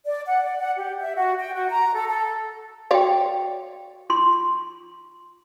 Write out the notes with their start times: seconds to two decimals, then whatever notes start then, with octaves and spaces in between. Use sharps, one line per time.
0.05 D5
0.26 F#5
0.44 D5
0.60 F#5
0.77 G4
0.99 E5
1.16 F#4
1.39 G5
1.54 F#4
1.70 A#5
1.94 A4
2.07 A4
2.91 F#4 C#5 D5 F5 G5
4.10 F4 C6